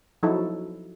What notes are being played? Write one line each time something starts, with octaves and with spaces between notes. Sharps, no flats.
F3 F#3 D#4 E4 F#4 A4